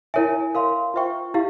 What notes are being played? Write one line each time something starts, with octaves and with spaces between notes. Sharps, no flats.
E4 A#4 C#5 E5 G#5
A#4 F5 C6
F4 C5 E5 G5 C#6
E4 G4 F5